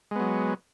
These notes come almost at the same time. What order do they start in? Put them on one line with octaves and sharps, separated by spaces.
G#3 B3 F#3